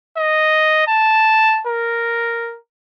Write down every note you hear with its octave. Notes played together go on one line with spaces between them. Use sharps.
D#5
A5
A#4